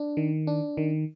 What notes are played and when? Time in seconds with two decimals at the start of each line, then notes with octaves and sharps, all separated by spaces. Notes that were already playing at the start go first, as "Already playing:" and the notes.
Already playing: D4
0.17 D#3
0.47 D4
0.77 D#3